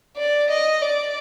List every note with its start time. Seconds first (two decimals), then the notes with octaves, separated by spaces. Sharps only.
0.17 D5
0.50 D#5
0.82 D5